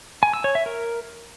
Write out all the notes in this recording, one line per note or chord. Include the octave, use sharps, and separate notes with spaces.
G#5
E6
C#5
E5
A#4